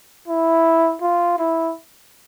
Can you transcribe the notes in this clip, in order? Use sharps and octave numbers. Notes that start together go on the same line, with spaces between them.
E4
F4
E4